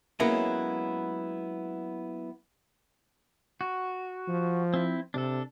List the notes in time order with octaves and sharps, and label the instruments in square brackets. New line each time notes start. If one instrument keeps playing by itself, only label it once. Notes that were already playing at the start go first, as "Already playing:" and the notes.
[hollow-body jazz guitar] F#3 G#3 A#3 B3 C#4 E4
[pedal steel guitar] F#4
[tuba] F3
[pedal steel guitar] C4 E4
[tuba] C3 [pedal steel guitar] D4 A4